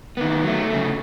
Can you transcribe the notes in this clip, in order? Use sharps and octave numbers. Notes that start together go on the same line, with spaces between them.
D#3 A#3 B3
F#3 A3
C#3 A3